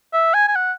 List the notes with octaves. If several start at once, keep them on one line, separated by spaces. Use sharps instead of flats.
E5
G#5
G#5
F#5